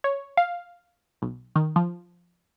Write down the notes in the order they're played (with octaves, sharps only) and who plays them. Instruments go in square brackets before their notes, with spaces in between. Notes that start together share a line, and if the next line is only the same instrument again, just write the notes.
[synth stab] C#5
F5
B1
D#3
F3